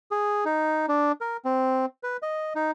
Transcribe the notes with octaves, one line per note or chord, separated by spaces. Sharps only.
G#4
D#4
D4
A#4
C4
B4
D#5
D#4